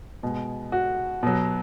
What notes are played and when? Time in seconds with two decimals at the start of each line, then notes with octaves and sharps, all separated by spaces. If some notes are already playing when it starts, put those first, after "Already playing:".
0.23 B2 G#3
0.72 F#4
1.23 B2 F#3